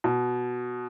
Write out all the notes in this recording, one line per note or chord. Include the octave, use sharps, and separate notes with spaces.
B2